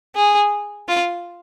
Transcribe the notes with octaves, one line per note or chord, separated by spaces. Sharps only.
G#4
F4